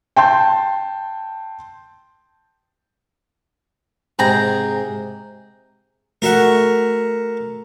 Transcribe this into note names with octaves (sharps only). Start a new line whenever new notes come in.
G5 A5 C6 G6
G#2 C3 G#4 G5 A#5
A3 F#4 A#4 E5 F#5